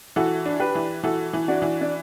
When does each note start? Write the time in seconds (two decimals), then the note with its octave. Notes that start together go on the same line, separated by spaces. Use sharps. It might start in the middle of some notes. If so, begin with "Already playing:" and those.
0.16 E3 F#4 A4
0.46 D4
0.60 G4 B4
0.75 E3
1.03 E3 F#4 A4
1.33 E3
1.48 D4 F#4
1.62 E3
1.81 D4